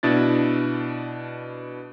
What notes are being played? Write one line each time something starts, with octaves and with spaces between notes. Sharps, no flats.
B2 D4 E4 A6